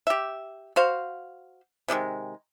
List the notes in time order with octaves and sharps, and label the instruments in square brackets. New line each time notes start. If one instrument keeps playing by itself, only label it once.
[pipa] G4 E5
F#4 C5 F5
C3 D#3 E3 G#3